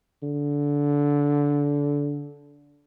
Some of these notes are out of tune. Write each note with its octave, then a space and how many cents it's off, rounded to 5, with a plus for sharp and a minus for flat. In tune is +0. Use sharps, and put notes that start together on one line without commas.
D3 -20